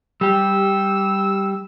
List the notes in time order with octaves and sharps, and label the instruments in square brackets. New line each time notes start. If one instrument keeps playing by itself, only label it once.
[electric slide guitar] G3 G4 [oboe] E6